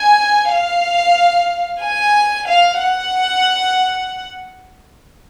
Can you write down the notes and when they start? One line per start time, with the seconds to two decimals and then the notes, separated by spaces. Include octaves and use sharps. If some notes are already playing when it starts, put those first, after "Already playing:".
Already playing: G#5
0.53 F5
1.83 G#5
2.48 F5
2.80 F#5